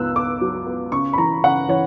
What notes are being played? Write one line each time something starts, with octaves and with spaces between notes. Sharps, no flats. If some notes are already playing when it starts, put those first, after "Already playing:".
Already playing: C#2 B3 E6 F#6
B3 D6
F#3
B3
C#3 C#6
B5
E3 A#5
C#3 F#5
E3 C#5